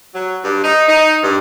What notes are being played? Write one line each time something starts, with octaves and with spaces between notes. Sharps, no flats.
F#3
G2
D#4
D#4
G2